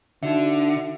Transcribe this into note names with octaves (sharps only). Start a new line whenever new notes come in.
D3 D#4 F#4 E5